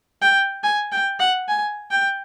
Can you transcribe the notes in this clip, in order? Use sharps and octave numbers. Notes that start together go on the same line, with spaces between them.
G5
G#5
G5
F#5
G#5
G5